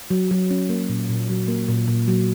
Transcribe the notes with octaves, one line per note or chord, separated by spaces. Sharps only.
F#3
F#3
C#4
A#3
A#2
A#2
F#3
A#3
A#2
A#2
F#3